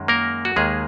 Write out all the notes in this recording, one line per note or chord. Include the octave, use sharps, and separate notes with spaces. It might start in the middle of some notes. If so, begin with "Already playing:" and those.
Already playing: F#2 D#3 G#3
A#3 A#4
F#4
D#2 D#3 G#3 A#3 G#4